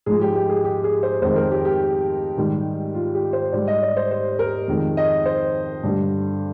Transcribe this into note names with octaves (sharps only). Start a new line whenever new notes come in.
G#2 F3 G#3 G#4
G4
G4
G#4
G4
G#4
C5
F2 D#3 G#3 C5
A#4
G4
G4
G#2 D#3 G3
F4
G4
C5
G#2 G3 D5
D#5
D5
C5
C5
A#4
F2 D#3 G#3
D#5
C5
G2 D3 G3